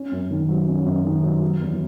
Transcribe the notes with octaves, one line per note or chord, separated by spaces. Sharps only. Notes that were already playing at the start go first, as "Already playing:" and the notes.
Already playing: C#4
F#2
D#3
F#3
C#4
F#2
D#3
F#3
F#3
E2